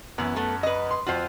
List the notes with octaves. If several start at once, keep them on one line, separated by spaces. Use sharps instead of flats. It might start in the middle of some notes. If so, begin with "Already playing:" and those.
F#2 E3 B3
A3 B3 A4
B4 D#5
C6
F2 F4 F#4 C5